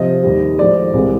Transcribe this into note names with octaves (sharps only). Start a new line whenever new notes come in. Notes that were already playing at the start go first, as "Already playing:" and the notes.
Already playing: C3 F3 D#5
D#2 D#3 G3
A2 F3 G#3 D5
C2 C3 E3 G#3